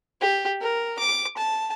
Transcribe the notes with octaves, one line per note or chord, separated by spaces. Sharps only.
G4
A#4
D6
A5